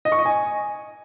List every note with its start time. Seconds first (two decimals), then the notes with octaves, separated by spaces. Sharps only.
0.05 D#5
0.12 C#6
0.19 D#5
0.25 G#5